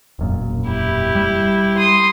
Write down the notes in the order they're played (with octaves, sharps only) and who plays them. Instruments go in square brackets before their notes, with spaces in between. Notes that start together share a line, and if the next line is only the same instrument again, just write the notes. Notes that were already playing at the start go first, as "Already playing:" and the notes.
[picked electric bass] E1 F#2 A#2
[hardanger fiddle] E4 G4
[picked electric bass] G3
[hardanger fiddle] C6 D#6